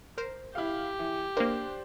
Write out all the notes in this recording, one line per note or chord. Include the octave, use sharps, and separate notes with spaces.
A#4 C5
E4 G4 F5
E3
A#3 D4 A#4 C5